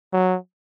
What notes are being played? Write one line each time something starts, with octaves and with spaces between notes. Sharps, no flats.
F#3